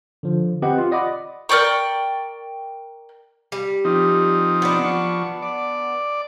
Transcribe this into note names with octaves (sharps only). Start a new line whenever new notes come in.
D3 F3
C4 G4 B4 D#5 F#5
F4
D5 D#5 F#5 B5 D6
A#4 D5 G5 C#6
G3
F3 C4 D#4
B3 D4
F3 C#6
D5